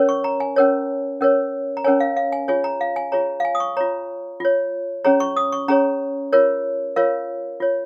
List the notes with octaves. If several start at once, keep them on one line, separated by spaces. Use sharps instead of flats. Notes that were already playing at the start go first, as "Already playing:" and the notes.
Already playing: C#4 A#4 C#5
C#6
A#5
G#5
C#4 A#4 C#5
C#4 A#4 C#5
A#5
C#4 A#4 C#5 G#5
F5
F5
G#5
F4 G#4 C#5 G#5
A#5
F5
G#5
F4 G#4 C#5 A#5
F5
G#5
D#6
C#6
F4 C#5 A#5
F4 C#5
C#4 G#4 C#5 A#5
C#6
D#6
C#6
C#4 G#4 C#5 A#5
F4 A#4 C#5
F4 A#4 C#5 F5
F4 C#5